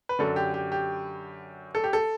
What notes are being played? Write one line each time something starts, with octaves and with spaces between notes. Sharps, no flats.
B4
F#2 D3 A4
G4
G4
G4
A4
G4
A4